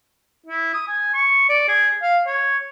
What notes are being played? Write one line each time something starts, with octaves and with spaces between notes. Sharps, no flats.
E4
D#6
G#5
C#6
D5
G#4
F5
C#5